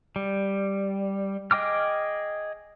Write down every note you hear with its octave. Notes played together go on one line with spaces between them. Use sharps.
G3
G#4 D#5 G5 D6 F6